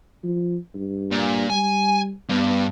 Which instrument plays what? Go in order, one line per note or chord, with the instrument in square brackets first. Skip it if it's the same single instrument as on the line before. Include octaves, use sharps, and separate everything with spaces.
[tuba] F3
G2
[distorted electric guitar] A#2
[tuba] G3 [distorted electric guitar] G#5
[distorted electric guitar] G2 [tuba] B3